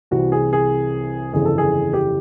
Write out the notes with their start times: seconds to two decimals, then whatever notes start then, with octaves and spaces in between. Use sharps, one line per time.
0.11 C2 C3 E3 F#4
0.32 G#4
0.53 G#4
1.33 G1 F2 C#3 E3 G#4
1.45 A4
1.58 G#4
1.93 G4